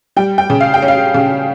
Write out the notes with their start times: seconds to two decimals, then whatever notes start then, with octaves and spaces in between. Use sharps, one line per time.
0.17 G3 G5
0.38 G5
0.50 C#3
0.61 F5
0.74 G5
0.82 C#4
0.88 F5
1.14 C#3